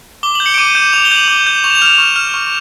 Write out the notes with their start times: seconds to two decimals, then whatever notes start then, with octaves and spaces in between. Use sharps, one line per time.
0.23 D6 G7
0.35 G6 F#7
0.46 C#7
0.54 D7
0.58 D6 D#7
0.75 G6 E7
0.93 D6 F7
1.05 G7
1.11 G6 F#7
1.28 D6
1.47 G6
1.64 C#6 F7
1.70 E7
1.75 F7
1.82 F6 E7
1.98 C#6 E7
2.16 F6
2.34 C#6